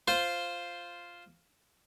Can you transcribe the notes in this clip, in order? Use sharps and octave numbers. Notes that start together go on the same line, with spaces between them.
F4 C5